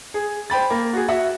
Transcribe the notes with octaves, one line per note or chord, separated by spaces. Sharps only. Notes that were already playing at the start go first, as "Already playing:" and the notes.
G#4
C5 G5 B5 A6
A#3
F#4 G#4
F#4 E5 F#5